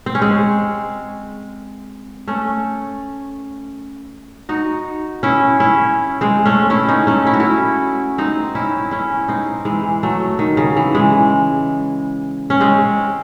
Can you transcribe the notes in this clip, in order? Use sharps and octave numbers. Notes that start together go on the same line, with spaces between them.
C4
C#4
G#3 C4
A3 C#4
D#4 F#4
C#4 E4
C#4 E4
G#3 C4
A3 C#4
C#4 E4
C4 D#4
A3 C#4
E4
F#4
C#4 E4
C4 D#4
C#4 E4
C#4 E4
C4 D#4
E3 G#3
F#3 A3
D#3
C#3
E3
E3 G#3
C#4
G#3 C4